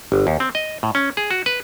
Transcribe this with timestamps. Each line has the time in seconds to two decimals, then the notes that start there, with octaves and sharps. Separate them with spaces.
0.12 G1
0.27 D#2
0.40 C4
0.55 D#5
0.83 A2
0.95 C#4
1.17 G#4
1.31 F#4
1.46 B4